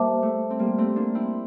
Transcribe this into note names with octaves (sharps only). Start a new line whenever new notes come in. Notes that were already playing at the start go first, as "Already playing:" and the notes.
Already playing: G3 A#3 C5 E5 A5 D6
A3
C4
G3 A#3
A3 C4
A#3 D4
C4 E4